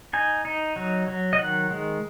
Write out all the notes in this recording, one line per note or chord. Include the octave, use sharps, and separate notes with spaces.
D#4 G#5
D#4
F#3
F#3
D#5
D#3 F#5
G#3